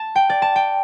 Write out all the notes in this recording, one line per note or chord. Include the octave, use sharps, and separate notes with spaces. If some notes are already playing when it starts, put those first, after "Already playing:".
Already playing: A5
G5
D5
A5
G5